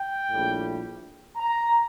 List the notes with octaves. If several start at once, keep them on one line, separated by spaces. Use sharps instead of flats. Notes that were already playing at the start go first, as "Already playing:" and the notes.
Already playing: G5
A#1 A2 G3
A#5